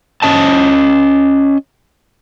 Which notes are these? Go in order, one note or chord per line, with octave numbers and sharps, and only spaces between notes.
C#4 D#5 A5